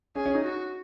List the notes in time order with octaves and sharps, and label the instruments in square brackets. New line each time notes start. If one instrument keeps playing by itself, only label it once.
[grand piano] C#4 [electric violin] G#4
[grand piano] C#4
D#4
[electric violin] F#4